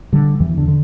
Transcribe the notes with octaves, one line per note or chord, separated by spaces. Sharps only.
D3 G3
E2 E3
D3
D3